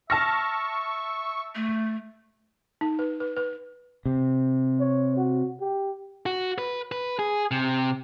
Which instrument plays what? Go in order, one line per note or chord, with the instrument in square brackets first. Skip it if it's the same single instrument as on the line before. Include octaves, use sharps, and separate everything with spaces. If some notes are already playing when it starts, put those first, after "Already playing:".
[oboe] E5 [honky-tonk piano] A5 F6 A#6 [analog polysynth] C#6
[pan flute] A3
[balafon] D#4
B4
B4
B4
[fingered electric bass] C3
[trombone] C#5
F#4
G4
[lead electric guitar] F#4
B4
B4
G#4
C3